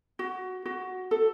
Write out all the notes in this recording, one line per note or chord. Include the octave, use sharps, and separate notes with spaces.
F#4
F#4
A4